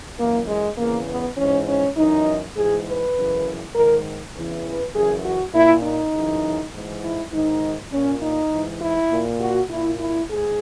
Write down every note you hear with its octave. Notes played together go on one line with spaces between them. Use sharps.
F#2 E3 A#3
G#3
E2 C#3 E3 A#3
B3
G#2 E3 C#4
C#4
F#2 E3 D#4
G#2 E3 G#4
B4
F#2 C#3 E3
G#2 D#3 A#4
E2 C#3 E3
B4
F#2 C#3 E3 G#4
F#4
A#2 E4
D#4
F#2 C#3 E3
G#2 E3
E4
G#2 D#3 D#4
A#2 C#4
D#4
G#2 E3
E4
A#2
F#4
A#2 E4
E4
G#2 G#4